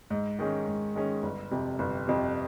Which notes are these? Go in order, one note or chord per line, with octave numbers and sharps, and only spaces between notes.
G#2
D#3 G#3 C#4
G#2
D#3 G#3 C#4
G1
F2 C3
G1
F2 C3